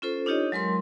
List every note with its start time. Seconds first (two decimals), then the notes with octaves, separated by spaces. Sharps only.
0.02 C#4 F4 A4 C5
0.26 D4 D#4 F4 G4 C#5 D#5
0.52 F#3 G#3 A#4 C6